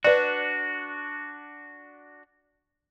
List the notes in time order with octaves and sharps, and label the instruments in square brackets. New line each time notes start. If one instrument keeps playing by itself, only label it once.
[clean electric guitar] D4 F#4 [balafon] B4 D5